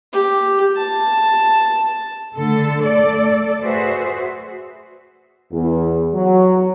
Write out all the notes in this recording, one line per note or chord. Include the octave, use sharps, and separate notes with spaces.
G4
A5
D3 A3 A4
A3 A4 D5
F#4 G#4 B4 C5 E5
E2
F#3